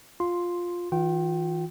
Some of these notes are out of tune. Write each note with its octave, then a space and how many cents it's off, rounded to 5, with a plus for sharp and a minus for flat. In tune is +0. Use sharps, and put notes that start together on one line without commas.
F4 +10 C6 +0
E3 -25 F4 +35 G5 -20